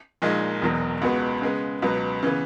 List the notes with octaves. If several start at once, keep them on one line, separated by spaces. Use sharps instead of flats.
A#1 A#2 G#3 D#4
E1 E2 B2 F#3
C#2 B2 G#3 B3 F#4
C#3 G#3 B3
C#2 B2 F#3 B3
C#3 E3 B3